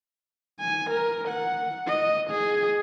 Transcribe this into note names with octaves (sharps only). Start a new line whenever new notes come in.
G#5
A#4
F#5
D#5
G#4